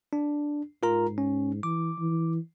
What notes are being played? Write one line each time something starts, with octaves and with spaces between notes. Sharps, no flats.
D4
G#2 F4 A#4 A#5
C#4
E3 D6
E3